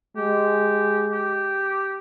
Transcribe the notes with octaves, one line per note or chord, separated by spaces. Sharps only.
G#3 G4
G4